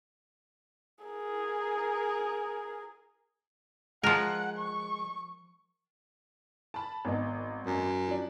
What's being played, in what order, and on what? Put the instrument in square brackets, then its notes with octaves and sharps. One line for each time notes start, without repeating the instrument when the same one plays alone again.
[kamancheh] G#4 A#4
[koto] F3 A#4 [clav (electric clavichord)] G#3 [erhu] F#5
[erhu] C#6
[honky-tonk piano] A5 B5
G#1 B3 D#4
[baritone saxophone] F#2
[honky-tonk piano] F3 D4